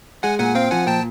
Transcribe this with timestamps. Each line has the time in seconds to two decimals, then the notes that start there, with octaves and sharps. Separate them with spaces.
0.23 G#3 F#5 G#5
0.39 A#2 F#5 G#5
0.55 C4 F5 G5
0.71 F3 F#5 G#5
0.87 A#2 G5 A5